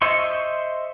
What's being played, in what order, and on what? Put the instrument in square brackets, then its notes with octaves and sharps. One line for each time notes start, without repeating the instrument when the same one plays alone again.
[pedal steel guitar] C5 D#5 E5 C6 C#6